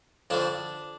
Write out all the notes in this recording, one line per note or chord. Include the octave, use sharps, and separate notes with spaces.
F2 D3 F3 D4